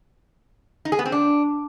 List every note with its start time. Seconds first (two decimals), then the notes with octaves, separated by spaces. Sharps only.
0.85 D#4
0.92 G#4
0.99 B3
1.06 C4
1.12 D4